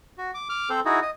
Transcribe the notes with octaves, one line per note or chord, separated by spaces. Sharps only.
F#4
D6
D6 F6
C4 A4 C5
D#4 E4 F#4 G#4
D#5